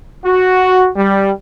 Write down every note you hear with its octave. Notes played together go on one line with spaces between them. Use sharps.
F#4
G3